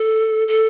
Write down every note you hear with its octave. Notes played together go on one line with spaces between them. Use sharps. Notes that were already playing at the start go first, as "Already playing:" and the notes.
Already playing: A4
A4